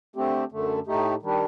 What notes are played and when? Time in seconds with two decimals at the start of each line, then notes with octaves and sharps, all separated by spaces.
0.16 D3 A3 C4 G4
0.52 F#2 D3 A3
0.87 A2 A3 D#4 G4
1.22 D#3 G3 D4 G4